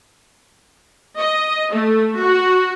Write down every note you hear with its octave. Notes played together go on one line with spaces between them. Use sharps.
D#5
A3
F#4